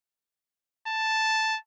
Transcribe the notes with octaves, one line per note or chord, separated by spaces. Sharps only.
A5